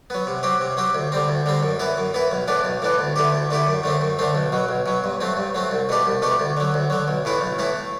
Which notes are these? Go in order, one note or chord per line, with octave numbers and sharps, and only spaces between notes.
F#3 B3
C3
F#3 C4 G4
C3
F#3 C4 G4
D2
D3 G3 C4
D2
D3 G3 C4
F#2
E3 B3 E4
F#2
E3 B3 E4
B1
A2 E3 B3 D4
B1
A2 E3 B3 D4
D2
D3 A3 E4 G4
D2
D3 A3 E4 G4
F#2
D3 A3 C4
F#2
D3 A3 C4
B1
B2 F#3
B1
B2 F#3
G2
F#3 A3 C4
G2
F#3 A3 C4
C2
B2 A3 D4 G4
C2
B2 A3 D4 G4
D2
D3 F#3
D2
D3 F#3
B1
A2 E3 A3 E4
B1
A2 E3 A3 E4